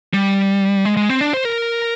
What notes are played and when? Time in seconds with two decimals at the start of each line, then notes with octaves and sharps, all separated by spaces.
0.14 G3
0.85 G#3
0.97 G#3
1.09 C4
1.21 D4
1.34 C5
1.45 A#4